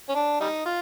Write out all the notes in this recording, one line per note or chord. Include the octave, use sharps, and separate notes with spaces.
C#4
D4
G3 D#4
F4